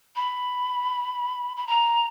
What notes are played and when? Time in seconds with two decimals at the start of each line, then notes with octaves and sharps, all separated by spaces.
0.15 B5
1.56 B5
1.66 A#5